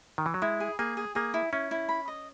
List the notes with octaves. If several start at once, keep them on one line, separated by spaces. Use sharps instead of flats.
D#3
E3
F#3
G#3 E4
G#4
A#3 G#4
G#4
A#3 G#4
E4
C#4 E4
E4
B5
D#5